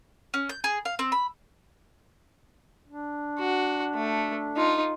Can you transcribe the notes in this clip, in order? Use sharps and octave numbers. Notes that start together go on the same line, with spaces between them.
C#4
G6
G#4
F5
C4
B5
D4
F#4
A3
D#4 F4